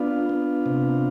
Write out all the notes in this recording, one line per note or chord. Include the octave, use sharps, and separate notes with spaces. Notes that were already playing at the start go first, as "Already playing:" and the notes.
Already playing: B3 D4 F4
B3
C3